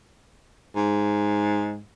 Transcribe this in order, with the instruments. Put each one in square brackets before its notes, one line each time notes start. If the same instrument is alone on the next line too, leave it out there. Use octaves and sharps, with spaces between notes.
[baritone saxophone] G#2